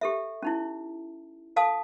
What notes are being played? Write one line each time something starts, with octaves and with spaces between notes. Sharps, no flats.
G4 A4 E5
C#4 D#4 E4
A4 F5 A5 D#6